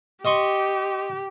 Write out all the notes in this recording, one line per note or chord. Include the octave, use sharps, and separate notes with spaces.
G4 D#5 C6 C#6